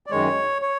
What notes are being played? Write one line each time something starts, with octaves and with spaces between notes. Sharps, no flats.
D5
F#2 D#3 G#3 C#5
C#5